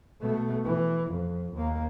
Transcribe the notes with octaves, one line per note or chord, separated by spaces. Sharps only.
B2 A3
E3
F2
D#2 A#3